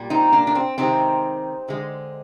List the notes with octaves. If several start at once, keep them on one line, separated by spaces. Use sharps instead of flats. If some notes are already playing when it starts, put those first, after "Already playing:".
Already playing: A#2 G3
C4 D#4
A#3 D4
D4
C4
C3 D#3 G#3 C4 D#4
D3 G#3